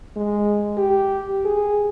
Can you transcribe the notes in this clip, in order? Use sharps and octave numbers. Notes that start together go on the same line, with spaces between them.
G#3
G4
G#4